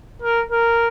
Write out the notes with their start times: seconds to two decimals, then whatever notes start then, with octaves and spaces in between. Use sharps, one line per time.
0.22 A#4
0.51 A#4